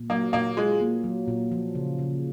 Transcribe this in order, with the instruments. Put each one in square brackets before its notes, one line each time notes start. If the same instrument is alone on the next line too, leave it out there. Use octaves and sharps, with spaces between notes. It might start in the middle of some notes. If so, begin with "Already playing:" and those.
Already playing: [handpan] A#2
[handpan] F#3 [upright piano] A#3
[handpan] A#2 [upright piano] A#3
[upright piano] G#3 [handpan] F4
[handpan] A#3
F#3
A#2
F3
C#3
C#3